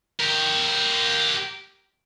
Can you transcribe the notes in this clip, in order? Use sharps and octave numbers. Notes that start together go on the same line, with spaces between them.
G4 A#4